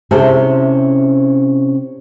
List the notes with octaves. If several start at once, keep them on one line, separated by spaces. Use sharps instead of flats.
C3 C#4 E4 G#4 A4 C5